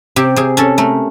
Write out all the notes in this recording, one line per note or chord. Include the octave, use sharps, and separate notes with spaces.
C3 G4
C3 G#4
C#4 A4
A3 A#4